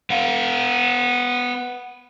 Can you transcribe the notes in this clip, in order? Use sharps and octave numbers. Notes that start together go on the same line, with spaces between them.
B3 F5